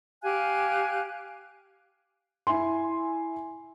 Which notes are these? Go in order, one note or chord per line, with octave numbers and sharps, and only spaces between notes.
G4 F5 G#5 F#6
E4 E5 G#5 C6